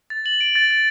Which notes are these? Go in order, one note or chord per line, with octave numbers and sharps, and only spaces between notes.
A6
F#7
D7
A6
A6